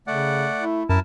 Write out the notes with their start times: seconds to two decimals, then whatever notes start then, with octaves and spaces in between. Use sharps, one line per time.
0.07 C#3 A3 D5 F#5
0.59 E4
0.89 F#2 E4 A#4 A5